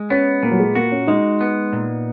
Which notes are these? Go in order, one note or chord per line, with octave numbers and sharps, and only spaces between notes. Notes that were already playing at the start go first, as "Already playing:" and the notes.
Already playing: G#3
B3 C#4
A#2 A#3
F#3
G#3
A#3 F#4
C#4
G#3 D#4
B3
A#2